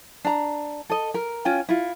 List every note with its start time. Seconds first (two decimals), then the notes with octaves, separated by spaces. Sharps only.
0.25 D4 A#5
0.90 A4 D#5
1.14 A#4
1.45 C#4 F4 G5
1.69 E4 F4